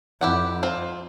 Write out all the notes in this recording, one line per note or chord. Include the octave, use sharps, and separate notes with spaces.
F2 E4 G4 F#5
C4 F4